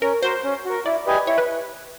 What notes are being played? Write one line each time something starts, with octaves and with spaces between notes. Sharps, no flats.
C#4 A#4
F#4 A#4 C5
C#4
F#4 A#4
E4 D5
G4 B4 D#5 G#5
E4 C#5
B4